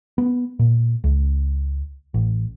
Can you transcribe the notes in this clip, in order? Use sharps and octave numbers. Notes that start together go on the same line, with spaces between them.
B3
A#2
C#2
A1